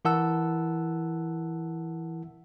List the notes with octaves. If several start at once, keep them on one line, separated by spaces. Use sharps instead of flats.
E3 E4 A#4 F#5 A5 E6